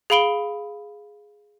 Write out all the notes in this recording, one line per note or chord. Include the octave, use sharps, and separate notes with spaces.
G#4 F5 B5 D7 G7